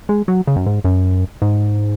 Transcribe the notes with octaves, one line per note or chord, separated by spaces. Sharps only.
G#3
F#3
C#3
F#2
G#2
F#2
G#2